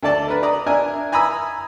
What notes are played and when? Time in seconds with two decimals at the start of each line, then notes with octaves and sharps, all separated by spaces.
0.03 D2 A4 D5 A5
0.28 A#4 B4
0.43 D5 A#5 D#6
0.66 D4 A#4 E5 G#5
1.12 G#5 A#5 B5 D#6 E6